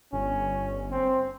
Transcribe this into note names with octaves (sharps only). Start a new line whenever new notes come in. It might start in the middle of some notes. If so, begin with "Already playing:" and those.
G1 C#4
C4